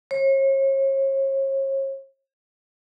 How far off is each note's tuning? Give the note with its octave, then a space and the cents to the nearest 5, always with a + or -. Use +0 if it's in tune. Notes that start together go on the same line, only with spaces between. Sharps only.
C#5 -40